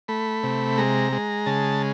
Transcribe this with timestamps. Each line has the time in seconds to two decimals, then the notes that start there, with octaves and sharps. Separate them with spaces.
0.08 A3 B5
0.44 C3
0.78 G#3 A#5
1.12 G#3
1.46 C#3 A5